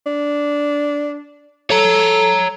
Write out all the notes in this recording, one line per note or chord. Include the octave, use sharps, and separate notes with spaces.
D4
A4 C#5 A#5